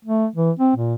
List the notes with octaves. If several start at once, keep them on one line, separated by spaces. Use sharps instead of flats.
A3
E3
C4
A#2